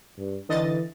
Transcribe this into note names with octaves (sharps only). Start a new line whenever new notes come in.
G2
D3 E3 D#5 A6